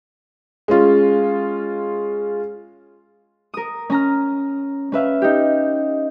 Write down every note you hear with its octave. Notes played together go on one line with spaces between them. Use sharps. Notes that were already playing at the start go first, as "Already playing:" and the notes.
G#3 C#4 F4
A#4 D#6
C#4 A#5 F6
C#4 B4 E5 F5
D#4 G4